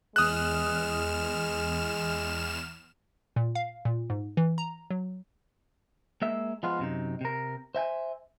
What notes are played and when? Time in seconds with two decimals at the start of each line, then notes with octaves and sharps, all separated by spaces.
0.16 E2 G#3 D#6 F6 F#6 E7
3.36 A#2
3.55 F5
3.85 A#2
4.10 G#2
4.37 E3
4.58 A#5
4.90 F#3
6.22 G#3 A#3 E5
6.63 F3 G#3 B3 F4
6.79 F#2 C3 D#4
7.21 C3 A#4
7.75 C5 E5 G5 G#5